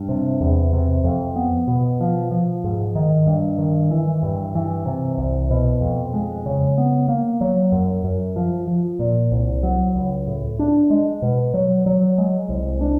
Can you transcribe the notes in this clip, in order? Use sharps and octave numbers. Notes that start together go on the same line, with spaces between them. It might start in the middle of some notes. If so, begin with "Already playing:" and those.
Already playing: G2
C3
E2
C3
F2
B3
B2
F3
F3
G#2
D#3
G2
D#3
E3
G2
E3
C3
C2
B2
F2
G#3
C#3
B3
A#3
F#3
F#2
F#2
F3
F3
A#2
C2
F#3
C#2
A2
D4
G#3
B2
F#3
F#3
G#3
C2
D4